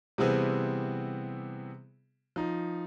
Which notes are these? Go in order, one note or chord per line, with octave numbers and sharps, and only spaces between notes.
C3 E3 G3 B3 C4 G#4
F3 D#4